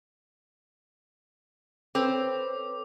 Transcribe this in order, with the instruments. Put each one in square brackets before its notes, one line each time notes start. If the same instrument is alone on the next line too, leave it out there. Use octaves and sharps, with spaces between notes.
[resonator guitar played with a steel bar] C4 [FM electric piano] A4 B4 C#5 [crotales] D6